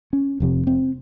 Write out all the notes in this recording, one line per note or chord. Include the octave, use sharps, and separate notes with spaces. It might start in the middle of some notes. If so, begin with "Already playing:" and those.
C#4
F1 F2 C3
C4